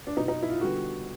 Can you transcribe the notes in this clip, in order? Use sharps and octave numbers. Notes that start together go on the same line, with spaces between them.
D4
B2 F#3 B3 D#4
D#4
E4
F4
D3 G3 B3 F#4